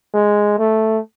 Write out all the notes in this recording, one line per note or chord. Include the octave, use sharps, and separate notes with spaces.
G#3
A3